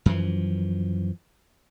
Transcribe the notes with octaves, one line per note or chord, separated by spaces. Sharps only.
F#2 E3 F3